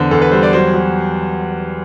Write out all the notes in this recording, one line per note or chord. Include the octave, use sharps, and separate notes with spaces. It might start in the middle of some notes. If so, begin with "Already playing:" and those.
Already playing: E2 D3 C5
E2 A4
B4
G3 C5
D5
F#3 C5
F#3